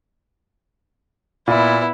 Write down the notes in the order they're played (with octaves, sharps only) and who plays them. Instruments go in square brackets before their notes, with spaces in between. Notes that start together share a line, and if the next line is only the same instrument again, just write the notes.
[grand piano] A#2 [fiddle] B3 E4